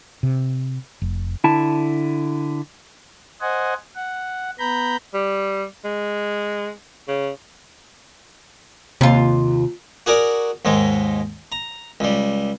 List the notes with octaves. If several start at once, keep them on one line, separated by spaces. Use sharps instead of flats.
C3
F1
D3 E4 A5
C5 D#5 F#5 G#5
F#5
B3 A#5 B5 G6
G3
G#3
C#3
D#2 C3 F4
F#4 G#4 A#4 D5
D#2 G#2 G#3
A#5
C#2 G3